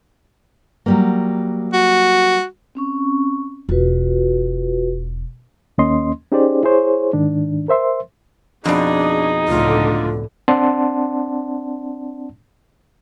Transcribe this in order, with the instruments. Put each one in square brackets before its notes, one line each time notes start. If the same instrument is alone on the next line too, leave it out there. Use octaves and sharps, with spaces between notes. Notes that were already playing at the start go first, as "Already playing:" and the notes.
[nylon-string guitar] F#3 G3 A#3
[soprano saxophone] F#4
[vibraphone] C4 C#4 C#6
[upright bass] E1 [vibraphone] F4 F#4 B4
[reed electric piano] D#2 A#3 C#4 D#5 C6
C#4 D#4 G4 G#4 C5 D5
E4 G#4 C5 C#5
G#2 D#3 D4
A#4 C5 E5 C6
[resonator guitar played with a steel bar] F2 B2 [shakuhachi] D4 [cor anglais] D#4 [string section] G#4
[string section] C#2 A2 D3 [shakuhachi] F4
[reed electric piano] C4 D4 D5 F#5 A5 C6